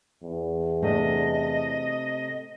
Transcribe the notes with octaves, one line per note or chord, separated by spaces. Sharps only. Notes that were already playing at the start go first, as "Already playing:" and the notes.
E2
C3 A3 D4 D#5